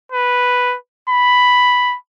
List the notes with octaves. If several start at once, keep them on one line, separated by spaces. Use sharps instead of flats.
B4
B5